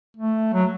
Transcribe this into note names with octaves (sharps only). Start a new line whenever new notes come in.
A3
F#3